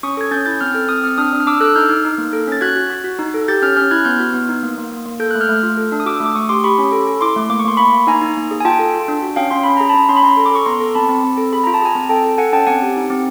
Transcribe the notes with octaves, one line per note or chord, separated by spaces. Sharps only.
C#4 C#6 D#6
A4 G#6
C#4 G6 A6
E4 G6 A6
C4 F6 G6
A4
C4 D#6 F6
C4 D#6 F6
D4 D#6 F6
D4
F6
D4 D6 E6
A4 E6 F#6
D#4 F6 G6
D#4
D#4
A#3
A4
C#4 A6
F#4 F#6 G#6
F#4
F#4
F#4
D#4
A4
G4 G6 A6
C#4 F6 G6
C#4 F6 G6
E4 F#6 G#6
B3 F6 G6
F#4
B3
D#4
A#3
A#3
A#3
A#3
A4 G6
A3 F#6
F6 G6
A3
F4
A4
D4
D#6
F#4 D6 E6
A3
D6
A3 C#6 D#6
G4 C6 D6
G4 B5 C#6
C#4
A4
A4
E4 C6 D6
A3
A#3 D6
C#6
A#3 C6
A#3 B5 C#6
A#3
D#4 G#5 A#5
D#4
A#3
G#4
G#5
F4 G5 A5
A4
F4
D4
F#4
C#4 F5 G5
C#4 C6
C#4 B5
G#4 A#5
A5 B5
C#4
C#4 C6
B5
C#4 A#5 C6
A4
D6
A4 C#6
B3 A#5 C6
A4
C4 A5 B5
C4
C4
A4
G#4 B5
F4 A#5
A5
G#4 G#5 A#5
C4
A4 G5 A5
A4
A4 F#5 G#5
C#4 G5 A5
C4 F#5 G#5
G4
D#4
C4